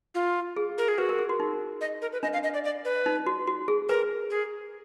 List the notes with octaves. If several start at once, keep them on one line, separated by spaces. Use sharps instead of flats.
F4
G#4
A#4
G#4
F#4 B4
A#4
G#4
F#4
D#4
D#5
A#4
B4
D4 D#5
F5
D#5
D5
D5
B4
D#4
F#4
F#4
G#4
A#4 B4
G#4